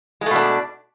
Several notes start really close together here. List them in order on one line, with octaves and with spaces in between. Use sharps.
G#3 A3 B2 D4